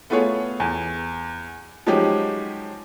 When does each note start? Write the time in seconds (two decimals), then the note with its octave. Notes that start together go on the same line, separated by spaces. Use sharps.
0.10 A3 B3 F4 G#4 C#5
0.60 E2
1.87 F3 F#3 G#3 C#4 D#4 G4